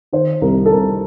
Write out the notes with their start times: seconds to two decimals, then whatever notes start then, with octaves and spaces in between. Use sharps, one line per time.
0.13 D#3 C5
0.41 C2 A#4
0.66 A4
0.72 C2 A#4